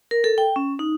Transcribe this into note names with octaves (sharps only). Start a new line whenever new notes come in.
A#4
A4
G5
C#4
D#4